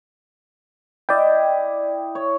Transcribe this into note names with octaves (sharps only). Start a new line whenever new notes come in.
E4 D5 D#5 G5
C#5